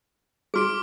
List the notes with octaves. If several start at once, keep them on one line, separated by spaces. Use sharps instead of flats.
F#4 G#4 D6 F6 D7